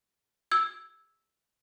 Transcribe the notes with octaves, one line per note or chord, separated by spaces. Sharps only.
E6 G#6